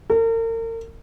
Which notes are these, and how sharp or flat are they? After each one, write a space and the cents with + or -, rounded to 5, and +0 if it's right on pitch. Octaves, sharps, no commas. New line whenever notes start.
A#4 -40